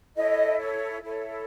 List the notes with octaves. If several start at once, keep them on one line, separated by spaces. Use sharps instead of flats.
E4 A4 C#5 D#5
C#5
E4 A4 C#5